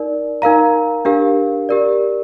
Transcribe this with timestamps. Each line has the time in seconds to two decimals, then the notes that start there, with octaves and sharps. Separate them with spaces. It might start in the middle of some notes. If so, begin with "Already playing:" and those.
Already playing: D#4 A#4 D5
0.42 D#4 A#4 F5 A#5
1.05 D4 G4 A#4 F5
1.69 G4 A#4 D5